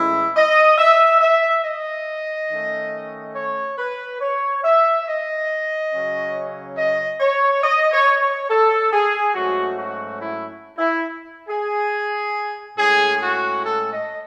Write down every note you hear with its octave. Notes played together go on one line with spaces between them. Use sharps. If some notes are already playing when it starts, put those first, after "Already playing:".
Already playing: A2 E3 G#3 C#4 E4
D#5
E5
E5
D#5
D#3 A3 C#4
C#5
B4
C#5
E5
D#5
C#3 F#3 C#4
D#5
C#5
D#5
C#5
C#5
A4
G#4
G#2 F#3 A3 C#4 F#4
F#4
E4
E4
G#4
A2 G#3 C#4 G#4
F#4
A4
D#5